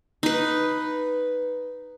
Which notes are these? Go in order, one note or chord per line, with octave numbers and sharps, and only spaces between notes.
D#4 B4